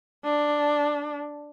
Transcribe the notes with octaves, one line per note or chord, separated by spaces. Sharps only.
D4